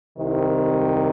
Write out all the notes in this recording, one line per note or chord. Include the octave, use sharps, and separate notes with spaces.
C2 C3 D#3